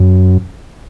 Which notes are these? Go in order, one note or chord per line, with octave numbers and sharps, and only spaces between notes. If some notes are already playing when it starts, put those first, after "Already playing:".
Already playing: F#2